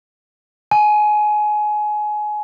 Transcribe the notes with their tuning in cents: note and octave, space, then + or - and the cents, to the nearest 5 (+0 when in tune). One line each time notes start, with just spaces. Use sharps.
G#5 +25